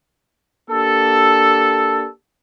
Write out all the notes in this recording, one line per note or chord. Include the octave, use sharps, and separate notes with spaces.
A#3 D4 G4 A4